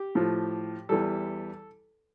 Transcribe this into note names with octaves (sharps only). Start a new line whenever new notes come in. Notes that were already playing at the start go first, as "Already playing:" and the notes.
Already playing: G4
A2 F3
E2 E3 G3 A4